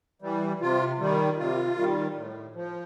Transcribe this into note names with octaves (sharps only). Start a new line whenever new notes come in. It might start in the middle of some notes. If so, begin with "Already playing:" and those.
E3 G3
C3 F4
D#3 G3
C3 F4
D#3 G3
A2
F3